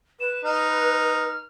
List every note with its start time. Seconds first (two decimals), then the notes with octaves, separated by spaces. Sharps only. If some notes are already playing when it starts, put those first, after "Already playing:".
0.20 B4 E7
0.45 D#4 F6